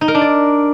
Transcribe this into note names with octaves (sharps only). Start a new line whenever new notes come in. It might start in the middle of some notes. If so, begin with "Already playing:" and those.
D#4
A#4
D4
D5